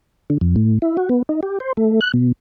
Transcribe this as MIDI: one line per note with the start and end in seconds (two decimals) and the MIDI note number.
0.30 0.38 50
0.41 0.55 41
0.56 0.79 45
0.82 0.97 64
0.97 1.09 66
1.09 1.22 59
1.29 1.40 63
1.43 1.59 67
1.60 1.73 72
1.77 2.00 57
2.01 2.12 90
2.14 2.32 47